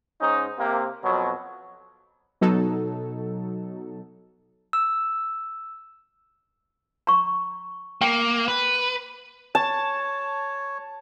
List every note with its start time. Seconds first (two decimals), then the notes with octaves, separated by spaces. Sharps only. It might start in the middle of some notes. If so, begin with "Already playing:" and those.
0.20 G#2 C#4 D#4
0.58 C3 A#3
1.04 F2 B2 F#3
2.41 B2 F#3 D#4 A4
4.73 E6
7.07 A#5 C#6
8.02 A#3 G5
8.48 B4
9.55 C#5 A5